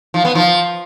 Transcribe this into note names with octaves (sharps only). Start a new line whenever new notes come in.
F3
B3
F3